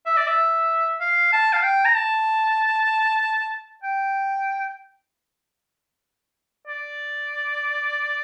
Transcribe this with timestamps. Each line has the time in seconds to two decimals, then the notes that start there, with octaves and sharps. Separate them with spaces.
0.06 E5
0.17 D5
0.27 E5
1.01 F5
1.32 A5
1.53 F5
1.63 G5
1.85 A#5
1.95 A5
3.83 G5
6.67 D5